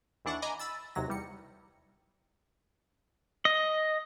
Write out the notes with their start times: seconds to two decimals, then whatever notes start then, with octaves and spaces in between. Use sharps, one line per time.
0.25 D#2 E3 D4 F#5 C#6
0.42 D#5 G#5 A#5 B5 D6
0.59 B5 E6 A6
0.95 D#2 C3 F#3 A#6
1.08 E2 G3 C#7
3.45 D#5